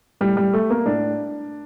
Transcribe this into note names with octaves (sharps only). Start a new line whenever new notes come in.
A2 G3
G3
A3
A#3
A2 D4